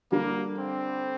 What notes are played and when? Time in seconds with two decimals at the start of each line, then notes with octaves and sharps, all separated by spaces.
0.12 D3 G3 A#3 D4
0.58 C4